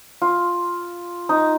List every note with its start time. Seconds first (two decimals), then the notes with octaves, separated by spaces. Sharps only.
0.22 F4
1.29 D#4